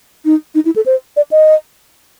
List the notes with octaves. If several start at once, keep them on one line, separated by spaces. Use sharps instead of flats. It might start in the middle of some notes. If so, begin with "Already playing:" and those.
D#4
D#4
E4
A4
C5
D5
D#5